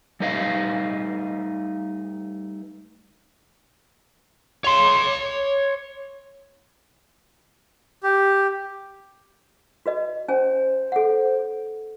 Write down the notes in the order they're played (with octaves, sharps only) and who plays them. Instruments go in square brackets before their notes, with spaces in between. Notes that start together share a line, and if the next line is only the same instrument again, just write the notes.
[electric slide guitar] G3 A3 D#4 B4 D#5 F5
[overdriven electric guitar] C#5 C6
[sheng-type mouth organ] G4
[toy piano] F#4 B4 D#5
[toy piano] C#4 G#5 [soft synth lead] C5
[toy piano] A4 F#5